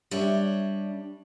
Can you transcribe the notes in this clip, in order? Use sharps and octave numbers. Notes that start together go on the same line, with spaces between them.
G3 D4 C#5 E5